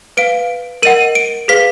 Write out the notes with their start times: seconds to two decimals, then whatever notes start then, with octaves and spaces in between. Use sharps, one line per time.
0.17 B4 F5 D7
0.82 A#4 D#5 F#5 D#7
1.15 D7
1.48 G#4 B4 F5 B6